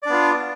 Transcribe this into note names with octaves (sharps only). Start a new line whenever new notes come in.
B3 D4 F4 D5